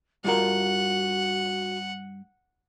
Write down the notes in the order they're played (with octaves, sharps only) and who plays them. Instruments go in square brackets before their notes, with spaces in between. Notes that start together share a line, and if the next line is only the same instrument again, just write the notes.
[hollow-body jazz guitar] G2 F4 A#4 [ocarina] F#4 [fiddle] F#5